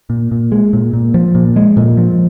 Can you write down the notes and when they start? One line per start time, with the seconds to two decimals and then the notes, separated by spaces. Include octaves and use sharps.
0.10 A#2
0.32 A#2
0.52 G#3
0.73 A#2
0.93 A#2
1.14 F3
1.35 A#2
1.56 G#3
1.77 A#2
1.97 F3